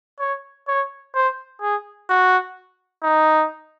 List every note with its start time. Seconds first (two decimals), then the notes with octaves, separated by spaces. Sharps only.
0.20 C#5
0.67 C#5
1.14 C5
1.61 G#4
2.09 F#4
3.03 D#4